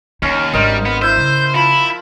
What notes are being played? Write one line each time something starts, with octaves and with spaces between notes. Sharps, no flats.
D#2 C#4 D#4
G#1 G3 D4 A#4 C5 D#5
B3
E4 C5 E5 G6
C#3
F3 E4 B5